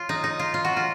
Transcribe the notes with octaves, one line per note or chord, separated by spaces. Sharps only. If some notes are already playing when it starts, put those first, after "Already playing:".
Already playing: F4
D#4
D#4
F4
F4
F#4
F4